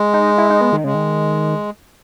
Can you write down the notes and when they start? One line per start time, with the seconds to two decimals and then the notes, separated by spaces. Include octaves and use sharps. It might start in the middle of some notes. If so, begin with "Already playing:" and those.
Already playing: G#3
0.13 D#4
0.38 E4
0.50 D#4
0.61 B3
0.73 D#3
0.84 C#3 G#3
0.95 D#3